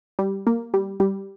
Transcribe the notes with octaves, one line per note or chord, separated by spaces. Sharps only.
G3
A#3
G3
G3